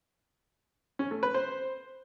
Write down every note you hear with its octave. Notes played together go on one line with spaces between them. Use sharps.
C#4
A3
B4
C5